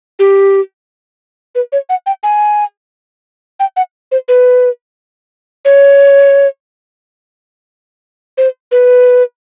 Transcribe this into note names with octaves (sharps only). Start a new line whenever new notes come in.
G4
B4
C#5
F#5
G5
G#5
G5
F#5
C5
B4
C#5
C5
B4